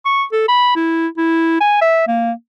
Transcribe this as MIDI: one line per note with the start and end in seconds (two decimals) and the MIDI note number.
0.06 0.24 85
0.32 0.44 69
0.48 0.72 83
0.76 1.08 64
1.18 1.58 64
1.61 1.79 80
1.81 2.06 76
2.08 2.32 58